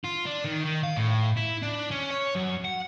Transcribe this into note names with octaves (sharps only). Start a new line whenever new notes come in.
F4
D4
D#3
D#3
F5
A2
E4
D4
C#4
C#5
F#2
F#5